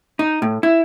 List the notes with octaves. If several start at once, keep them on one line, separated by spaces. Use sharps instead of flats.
D#4
A2
E4